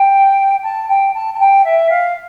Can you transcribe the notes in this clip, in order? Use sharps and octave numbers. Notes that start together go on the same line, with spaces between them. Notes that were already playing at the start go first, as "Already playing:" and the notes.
Already playing: G5
A5
G5
A5
A5
G5
E5
F5